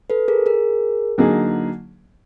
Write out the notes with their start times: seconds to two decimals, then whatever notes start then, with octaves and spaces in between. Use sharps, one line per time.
0.10 A4 B4
0.28 G#4 A#4
0.46 G#4 A#4
1.18 D3 F#3 A#3 D#4 G#4